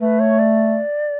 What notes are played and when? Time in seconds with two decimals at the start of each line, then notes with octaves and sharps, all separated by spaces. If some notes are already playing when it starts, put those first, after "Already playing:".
0.01 A3 B4
0.20 C#5
0.39 D5